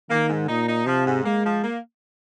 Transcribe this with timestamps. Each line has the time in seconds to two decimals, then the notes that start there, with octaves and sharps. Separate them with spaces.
0.10 D#3 A#3
0.29 G#2
0.49 A#2 D#4
0.68 D#4
0.87 C3 F3
1.05 G#2
1.25 G#3 A#3
1.44 F3
1.63 A#3